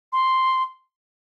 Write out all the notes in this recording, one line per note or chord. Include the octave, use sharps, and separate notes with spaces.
C6